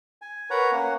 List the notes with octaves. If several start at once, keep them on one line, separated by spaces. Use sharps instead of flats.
G#5
A#4 B4 C#5 F#5 A#5
A#3 C#4 F#5